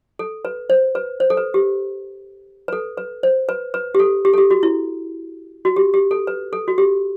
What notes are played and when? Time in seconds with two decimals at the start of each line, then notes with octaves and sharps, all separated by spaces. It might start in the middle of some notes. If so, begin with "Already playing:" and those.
0.19 A4
0.45 B4
0.70 C5
0.95 B4
1.20 C5
1.30 A4
1.37 B4
1.54 G4
2.68 B4
2.73 A4
2.98 B4
3.23 C5
3.49 B4
3.74 B4
3.95 G4
3.99 A4
4.25 G4
4.33 A4
4.38 G4
4.50 F#4
4.63 E4
5.65 F#4
5.76 G4
5.94 G4
6.11 A4
6.27 B4
6.53 A4
6.68 F#4
6.78 G4